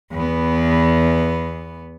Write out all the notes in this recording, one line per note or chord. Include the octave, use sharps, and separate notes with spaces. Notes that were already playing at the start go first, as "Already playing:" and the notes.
E2 B3